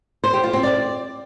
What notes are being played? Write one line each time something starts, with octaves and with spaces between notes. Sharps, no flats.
C5
G4
F4
C4
D5